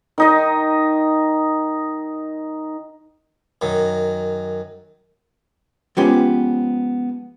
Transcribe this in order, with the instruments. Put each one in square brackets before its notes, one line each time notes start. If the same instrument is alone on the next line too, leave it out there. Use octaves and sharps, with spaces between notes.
[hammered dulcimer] D#3 D#4 D#5
[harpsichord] F#2 D#3
[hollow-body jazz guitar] F3 G#3 B3 C#4 G4